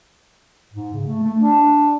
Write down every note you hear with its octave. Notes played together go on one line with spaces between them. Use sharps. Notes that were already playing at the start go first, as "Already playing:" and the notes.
G#2
C#3
A3
A3
D4